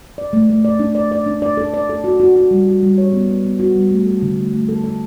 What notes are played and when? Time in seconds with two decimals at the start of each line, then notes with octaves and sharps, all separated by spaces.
0.18 D5
0.33 A3
0.49 A3
0.65 D5
0.79 D4
0.95 D5
1.12 D5
1.26 D4
1.42 D5
1.57 A4
1.74 D5
1.89 A4
2.04 F#4
2.20 F#4
2.36 F#4
2.51 G3
2.67 F#4
2.83 G3
2.98 C#5
3.13 B3
3.29 B3
3.45 B3
3.60 F#4
3.76 G3
3.91 A3
4.06 A4
4.22 D3
4.37 A3
4.53 A3
4.69 A4
4.84 A4